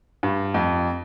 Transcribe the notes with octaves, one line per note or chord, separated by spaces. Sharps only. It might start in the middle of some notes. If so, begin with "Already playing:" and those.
G2
F2